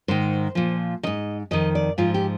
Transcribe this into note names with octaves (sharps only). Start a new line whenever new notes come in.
G#2 D#3 C5
A#2 F3
G#2 D#3 D#5
F2 D#3 D#5
D5
G#2 F3 F4
G4